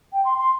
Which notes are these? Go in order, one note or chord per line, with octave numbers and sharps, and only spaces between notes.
G5
C6
C6